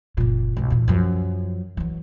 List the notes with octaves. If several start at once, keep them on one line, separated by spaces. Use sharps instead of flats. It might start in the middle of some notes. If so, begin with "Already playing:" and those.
F#1 A#2
B1 G#2
E2 A#2
F#2 F3
E3 F#3